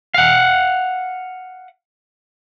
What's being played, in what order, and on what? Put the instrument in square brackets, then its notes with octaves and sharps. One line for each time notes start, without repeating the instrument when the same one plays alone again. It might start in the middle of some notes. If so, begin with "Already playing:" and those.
[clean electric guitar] F5 F#5